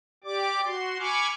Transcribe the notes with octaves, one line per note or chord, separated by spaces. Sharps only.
G4 D5 D6
F#4 C6
G#5 B5 C#6 D6 F6